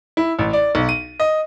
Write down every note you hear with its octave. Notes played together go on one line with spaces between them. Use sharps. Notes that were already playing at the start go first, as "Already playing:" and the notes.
E4
A1
D5
B1
D#7
D#5